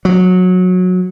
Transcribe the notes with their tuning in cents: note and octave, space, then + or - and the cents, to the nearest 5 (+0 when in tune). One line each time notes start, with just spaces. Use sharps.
F#3 -20